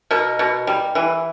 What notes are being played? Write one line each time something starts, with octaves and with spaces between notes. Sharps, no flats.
B2 A#4
B2
G3
E3